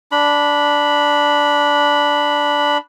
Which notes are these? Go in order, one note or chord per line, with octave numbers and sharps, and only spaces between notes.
D4 B5